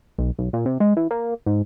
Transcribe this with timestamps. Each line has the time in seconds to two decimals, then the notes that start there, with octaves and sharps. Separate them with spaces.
0.18 B1
0.39 B1
0.53 A#2
0.66 C3
0.80 G#3
0.97 E3
1.11 A#3
1.46 G#2